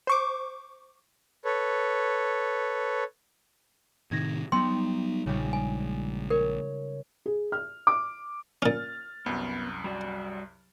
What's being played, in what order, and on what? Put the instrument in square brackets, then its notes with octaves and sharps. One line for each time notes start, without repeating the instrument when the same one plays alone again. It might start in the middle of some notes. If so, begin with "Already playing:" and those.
[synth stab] C5 C#6 D6
[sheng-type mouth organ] A4 B4 C#5
[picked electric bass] A2 C3 D#3 [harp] G#6 A#6
[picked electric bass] F#3 B3 [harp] G3 D#4 [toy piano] G5 C6 E6
[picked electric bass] A#1 [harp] C#3 G3 G#3
[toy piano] G#5
[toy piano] A#4 [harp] C#5
[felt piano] G#4
F6
D6
[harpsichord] A#2 C#4 [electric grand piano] F6 A6
[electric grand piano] C2 F#2 F#3 [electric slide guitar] B3
[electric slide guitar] G3 F#4 D5